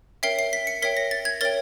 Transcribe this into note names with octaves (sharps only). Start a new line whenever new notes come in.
A#4 C#5 E5 G5 C7
C7
B6
C#7
A#4 C#5 E5 G5 B6
A#6
A6
G#6
A#4 C#5 E5 G5 A6